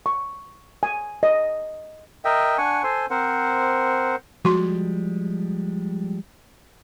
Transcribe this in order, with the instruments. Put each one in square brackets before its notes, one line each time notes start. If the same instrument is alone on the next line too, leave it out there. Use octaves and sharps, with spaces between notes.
[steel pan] C#6
G#5
D#5
[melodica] A#4 D#5 E5 G5
D4 F#5 G#5 C#6
A4 C5 G#5 C6
C4 A#4 C5 F#5
[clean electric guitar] F3 G3 G#3 [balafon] F#4 C6